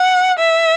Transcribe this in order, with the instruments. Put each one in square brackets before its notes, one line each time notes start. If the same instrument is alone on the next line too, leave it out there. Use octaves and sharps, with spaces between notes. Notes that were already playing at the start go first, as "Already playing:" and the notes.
Already playing: [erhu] F#5
E5